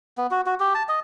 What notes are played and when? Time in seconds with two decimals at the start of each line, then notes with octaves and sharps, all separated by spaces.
0.18 B3
0.31 F#4
0.46 F#4
0.60 G4
0.74 A5
0.89 D#5